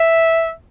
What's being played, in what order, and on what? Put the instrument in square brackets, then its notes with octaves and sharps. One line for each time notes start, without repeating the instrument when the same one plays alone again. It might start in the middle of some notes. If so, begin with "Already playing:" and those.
Already playing: [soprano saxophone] E5